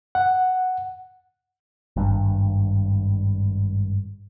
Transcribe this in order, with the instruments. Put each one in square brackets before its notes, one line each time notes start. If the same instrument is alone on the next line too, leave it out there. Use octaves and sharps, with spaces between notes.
[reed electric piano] F#5
[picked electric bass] G#1 G2